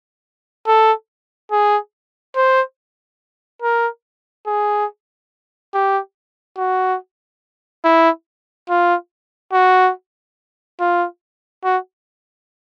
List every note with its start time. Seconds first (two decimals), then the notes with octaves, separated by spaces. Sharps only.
0.67 A4
1.52 G#4
2.36 C5
3.62 A#4
4.47 G#4
5.74 G4
6.58 F#4
7.84 E4
8.70 F4
9.53 F#4
10.80 F4
11.64 F#4